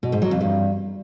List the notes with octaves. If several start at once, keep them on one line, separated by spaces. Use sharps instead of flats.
B2
G#2
F#3
F2
G2